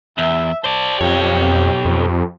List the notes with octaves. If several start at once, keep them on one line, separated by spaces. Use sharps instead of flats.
E2 E5
C5 D5 A5
B1 F2 G4 C#5
F2